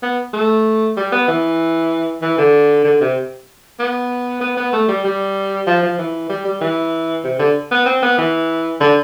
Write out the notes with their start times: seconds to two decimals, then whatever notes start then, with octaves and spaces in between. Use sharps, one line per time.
0.02 B3
0.33 A3
0.97 G3
1.12 B3
1.28 E3
2.22 E3
2.38 D3
2.84 D3
3.01 C3
3.79 B3
4.41 B3
4.57 B3
4.73 A3
4.88 G3
5.04 G3
5.67 F3
5.83 F3
5.98 E3
6.29 G3
6.45 G3
6.61 E3
7.24 C3
7.39 D3
7.71 B3
7.86 C4
8.02 B3
8.18 E3
8.81 D3